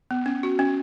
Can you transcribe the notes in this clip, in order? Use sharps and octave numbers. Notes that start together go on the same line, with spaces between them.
B3
C#4
F#4
C#4